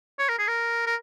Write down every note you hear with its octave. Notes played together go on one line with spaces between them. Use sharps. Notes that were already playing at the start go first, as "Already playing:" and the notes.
C#5
A#4
G#4
A#4
A#4